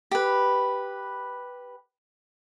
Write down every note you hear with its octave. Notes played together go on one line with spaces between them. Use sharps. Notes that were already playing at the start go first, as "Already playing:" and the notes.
G4 B4